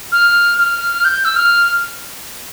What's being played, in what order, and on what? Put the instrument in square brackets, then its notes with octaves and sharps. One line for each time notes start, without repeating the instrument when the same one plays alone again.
[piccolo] F6
F6
G6
E6
F6